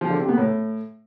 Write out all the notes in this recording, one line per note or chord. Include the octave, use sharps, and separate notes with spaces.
F3
D3
C3
B3
A2